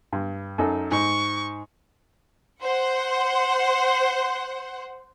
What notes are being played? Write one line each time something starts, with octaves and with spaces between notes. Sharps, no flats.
G2
F#2 D#4 A4
G#2 C#6
C5 F#5